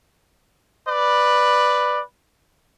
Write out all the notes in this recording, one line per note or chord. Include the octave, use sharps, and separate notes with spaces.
B4 D5